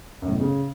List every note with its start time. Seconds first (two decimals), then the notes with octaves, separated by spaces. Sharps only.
0.22 F#2
0.28 A2
0.34 B2
0.40 C#3